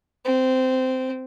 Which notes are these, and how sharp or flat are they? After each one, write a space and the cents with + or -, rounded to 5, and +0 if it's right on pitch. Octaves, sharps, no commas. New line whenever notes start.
C4 -15